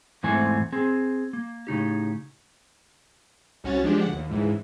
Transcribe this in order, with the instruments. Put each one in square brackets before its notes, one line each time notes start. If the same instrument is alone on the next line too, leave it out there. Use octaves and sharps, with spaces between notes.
[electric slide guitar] E2 G#2 E3 A3 C4 G#5
C4 G#4
A#3
A2 C#3 D#4 G4
[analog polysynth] C2 C#4 F#4 C#5 A6
F3 G#3 D4 G4
D2 F#5
D#2
C#2 G#2 E3